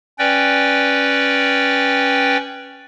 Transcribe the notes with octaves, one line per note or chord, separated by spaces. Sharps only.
C#4 B4 D5 G5